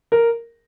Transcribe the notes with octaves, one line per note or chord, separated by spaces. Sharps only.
A#4